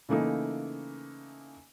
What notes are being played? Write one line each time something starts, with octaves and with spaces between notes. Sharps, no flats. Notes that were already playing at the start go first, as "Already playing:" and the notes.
C#3 E3 A3 A#3 D#4